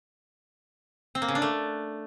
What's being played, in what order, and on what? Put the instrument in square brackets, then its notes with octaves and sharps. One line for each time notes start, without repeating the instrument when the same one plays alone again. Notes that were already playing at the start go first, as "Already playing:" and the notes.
[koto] C4
A#3
C#3
D4
A3